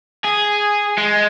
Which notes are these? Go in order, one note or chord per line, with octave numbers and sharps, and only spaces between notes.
G#4
G#3